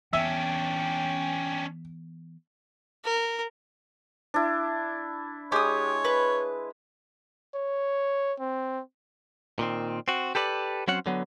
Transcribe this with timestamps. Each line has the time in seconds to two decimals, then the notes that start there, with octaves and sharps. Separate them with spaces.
0.13 E3 B3 C#4 D4 E5 G5
3.04 A#4
4.34 D4 E4
5.52 G#3 G4 C#5 D#6
6.05 B4
7.55 C#5
8.39 C4
9.59 A#2 D#3 C4
10.08 C4 F#4
10.35 G4 A4 B4 D5
10.88 F#3 C4 C#4 C5 F#5
11.06 D3 F#3 B3